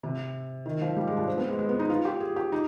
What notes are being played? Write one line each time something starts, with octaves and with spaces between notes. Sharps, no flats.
C3
D#3
F3
G3
G#3
D4
C4
B3
G#3
G#3
B3
D#4
F4
G4
G#4
G4
D#4